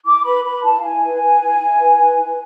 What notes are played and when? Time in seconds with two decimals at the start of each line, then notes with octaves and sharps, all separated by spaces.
0.05 E4 D6
0.25 B4 B5
0.44 B4 B5
0.63 E4 A5
0.78 F5
0.83 E4 G#5
1.02 B4
1.22 B4
1.41 E4
1.60 E4
1.80 B4
1.98 B4
2.19 E4